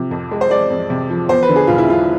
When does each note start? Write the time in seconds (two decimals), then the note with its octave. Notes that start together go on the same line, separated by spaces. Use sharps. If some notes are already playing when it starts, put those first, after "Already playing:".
Already playing: C3 F3
0.11 F2
0.31 G#3
0.41 C5
0.50 G#3 D5
0.70 F2
0.90 C3
1.10 F3
1.29 E2 C5
1.43 B4
1.50 D3
1.56 G#4
1.67 E1 F4
1.78 E4
1.89 E1 F4